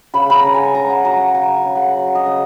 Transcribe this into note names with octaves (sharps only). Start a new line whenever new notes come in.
C#3 B5
A#5 B5
C#3
G#5
C#3 A#5
F#5
F#3 A#5
A#5
C#3 G#5
G#5
C#3
F#5
F#3
D#5
C#3